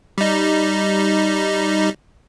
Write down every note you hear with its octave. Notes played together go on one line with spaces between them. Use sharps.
G3 D#4